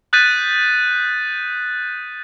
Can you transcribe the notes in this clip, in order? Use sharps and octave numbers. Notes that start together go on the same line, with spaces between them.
D#6 F#6 G6 A6 B6 D#7